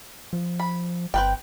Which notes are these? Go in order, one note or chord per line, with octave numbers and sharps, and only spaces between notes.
F3
B5
G1 C4 B4 G5